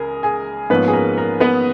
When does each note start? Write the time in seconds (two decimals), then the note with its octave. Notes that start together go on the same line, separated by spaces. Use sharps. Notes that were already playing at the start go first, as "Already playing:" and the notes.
Already playing: C#2 G#4 A#4 G#5
0.23 G#4 G#5
0.70 G#2 F3 A#3 B3 C#4 B4
0.88 G#4
0.93 A#4
1.18 A#4
1.40 B3 B4